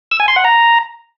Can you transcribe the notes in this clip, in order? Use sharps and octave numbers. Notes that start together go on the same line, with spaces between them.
E6
G#5
C6
F#5
A#5